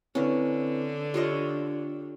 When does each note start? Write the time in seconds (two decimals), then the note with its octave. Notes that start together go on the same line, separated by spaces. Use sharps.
0.15 D3 C4 C#4 E4 B4
1.14 F4 G4 C#5 D#5